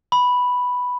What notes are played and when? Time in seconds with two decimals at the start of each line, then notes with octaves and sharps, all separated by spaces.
0.12 B5